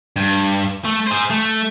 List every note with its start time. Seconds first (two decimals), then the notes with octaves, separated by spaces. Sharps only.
0.16 G2
0.85 A3
1.07 G#4 C5
1.30 A3